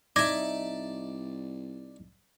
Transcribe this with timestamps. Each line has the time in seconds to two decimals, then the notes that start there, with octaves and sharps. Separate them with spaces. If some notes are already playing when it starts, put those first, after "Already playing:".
0.16 C2 D#4 D5 E5 A5 D6 G#6 A#6